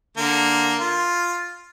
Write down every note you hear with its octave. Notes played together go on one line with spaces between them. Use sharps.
D3 A#3
F4